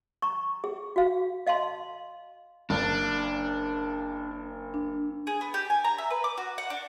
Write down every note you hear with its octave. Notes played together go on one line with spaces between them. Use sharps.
A#5 C#6
G#4
F#4 F5
D#5 F5 A5 C6
F#1 D4
D4
G#4
B3
G4
G#5
A#5
E5
B4
D6
F#4
F#5
D4